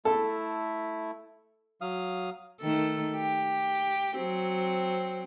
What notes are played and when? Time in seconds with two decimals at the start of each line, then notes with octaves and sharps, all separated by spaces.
0.05 A3 E4 A4
1.81 F#3 F5 D#6
2.61 D#3 A3 A4
3.17 G4
4.17 F#3 C4